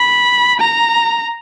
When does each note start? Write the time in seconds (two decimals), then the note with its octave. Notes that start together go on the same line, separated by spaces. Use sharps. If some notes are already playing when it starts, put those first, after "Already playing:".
Already playing: B5
0.60 A#5